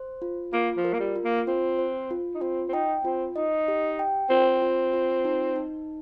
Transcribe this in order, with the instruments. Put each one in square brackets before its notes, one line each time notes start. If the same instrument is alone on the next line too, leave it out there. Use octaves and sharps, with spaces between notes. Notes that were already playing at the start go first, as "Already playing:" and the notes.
Already playing: [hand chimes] C5
F4
[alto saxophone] A#3 [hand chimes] F4
[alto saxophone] F3
[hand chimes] A#4
[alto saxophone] A#3
G3
[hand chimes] F4
[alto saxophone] A#3
[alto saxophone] C4 [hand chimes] F4
[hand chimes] C5
F4
[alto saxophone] D#4
[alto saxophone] C4 [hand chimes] F4
[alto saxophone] C4
[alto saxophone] D#4 [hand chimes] G5
[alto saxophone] C4 [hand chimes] F4
[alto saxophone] D#4 [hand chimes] D#5
[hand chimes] G4
G5
[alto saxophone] C4 [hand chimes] F4
[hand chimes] F4
F4
D#4
D#4